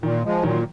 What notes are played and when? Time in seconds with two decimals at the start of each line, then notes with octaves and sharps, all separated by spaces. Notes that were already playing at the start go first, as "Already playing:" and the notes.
0.03 A#2 D#3
0.23 F3 G#3
0.43 A#2 D#3 F#3